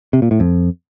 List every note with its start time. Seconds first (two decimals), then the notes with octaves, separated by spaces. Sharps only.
0.13 C3
0.22 A#2
0.31 A2
0.40 F2